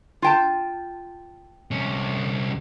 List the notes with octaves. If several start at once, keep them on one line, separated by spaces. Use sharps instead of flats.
F4 G5 A5
C2 C#4